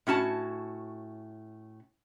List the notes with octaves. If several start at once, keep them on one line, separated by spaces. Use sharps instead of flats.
A2 C#4 F#4 A5